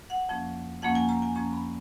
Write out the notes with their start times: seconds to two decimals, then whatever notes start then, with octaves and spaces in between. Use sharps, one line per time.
0.10 F#5
0.29 F2 F3 A#3 C#4
0.82 F2 F3 A#3 C#4 F#5
0.95 G#5
1.09 A#5
1.22 G#5
1.35 F2 F3 A#3 C#4 A#5
1.53 B5